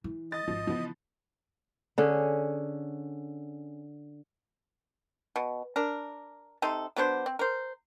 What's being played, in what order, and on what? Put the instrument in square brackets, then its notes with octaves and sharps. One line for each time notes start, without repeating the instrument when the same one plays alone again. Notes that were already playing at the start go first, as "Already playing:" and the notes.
[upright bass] E3
[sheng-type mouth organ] D#5 [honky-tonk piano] A6
[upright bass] G#1 [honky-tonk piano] F3
[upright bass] C#3 E3 [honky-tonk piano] F3 B3
[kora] D3 C#4 G#4
[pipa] B2
D4 A#4
C3 D#4 A4 C6
F#3 B3 D4 C5
C4
A#4 C5